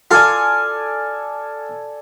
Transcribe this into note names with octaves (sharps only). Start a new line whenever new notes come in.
F4 A4 D5 G#5